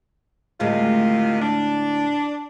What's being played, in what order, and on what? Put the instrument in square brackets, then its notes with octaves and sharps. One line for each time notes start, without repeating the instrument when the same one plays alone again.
[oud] D2 A2 G#3 [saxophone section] C3 D#3 F4
[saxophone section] D4